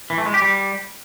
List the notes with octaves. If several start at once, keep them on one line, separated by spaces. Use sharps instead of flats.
E3
A3
G#3
G4
G3